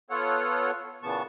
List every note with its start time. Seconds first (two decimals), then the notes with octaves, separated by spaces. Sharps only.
0.10 B3 F4 A4 C#5 F#5
1.03 A#2 C#3 E3 B3 A5 C#6